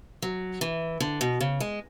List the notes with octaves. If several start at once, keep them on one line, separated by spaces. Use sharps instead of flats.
F#3
E3
D3
B2
C#3
G#3